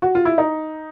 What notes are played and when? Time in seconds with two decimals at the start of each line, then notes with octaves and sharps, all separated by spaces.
0.02 F#4
0.15 F4
0.25 E4
0.38 D#4